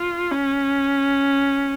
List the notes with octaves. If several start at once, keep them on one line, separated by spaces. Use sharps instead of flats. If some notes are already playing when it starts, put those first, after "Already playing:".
Already playing: F4
C#4